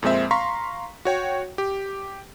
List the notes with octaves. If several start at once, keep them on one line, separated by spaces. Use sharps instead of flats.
F2 A#2 G#3 C4 E5
F5 A#5 C6 C#6 B6
F#4 C#5 G5
G4